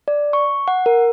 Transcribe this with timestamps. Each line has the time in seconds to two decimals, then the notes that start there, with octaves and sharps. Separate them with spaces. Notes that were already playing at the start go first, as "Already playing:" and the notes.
0.08 D5
0.33 C#6
0.68 F#5
0.86 A#4